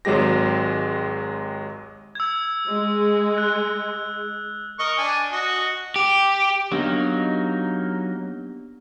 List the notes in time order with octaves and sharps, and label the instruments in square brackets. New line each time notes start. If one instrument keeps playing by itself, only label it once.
[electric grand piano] G#1 F#3 G#3 G4 A#6
[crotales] E6 G#6
[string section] G#3
[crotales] F#6
[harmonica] A#4 D#5 C#6
D4 G#5
F#4 D#5
[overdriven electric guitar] G4
[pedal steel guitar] F#3 A#3 D#4 [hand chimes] B3 D4 G4